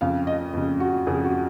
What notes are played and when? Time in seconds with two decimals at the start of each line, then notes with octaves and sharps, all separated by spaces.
0.01 F2 C#3 F5
0.27 D#5
0.53 F2 C#3
0.80 F#4
1.07 F2 C#3 G#4
1.25 F#4